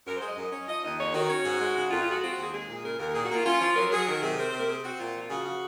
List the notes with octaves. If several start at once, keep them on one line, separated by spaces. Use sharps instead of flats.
F#2 A#4
C5
G#3
D#5
F#2
C#4
F3 D#5
D#2 D#5
F2 C#5
D#3 F#4
C#4
G#2
G#3
C#3
F2 F4
G#3 F4
F#4
C4 F4
F#4
D#2 G#4
G#3 G#4
A#2
C#3 A#4
D#2 A#4
A#4
A#2 G#4
F#4
A#3 F4
C#4 F4
F3 F4
F#3 A#4
F#3 G#4
D#3 A#4
C3 G#4
C4 A#4
C3 C5
A#4
C4 G#4
C4 F#4
A#2 F4
F3
F4
C#3 F#4
C#3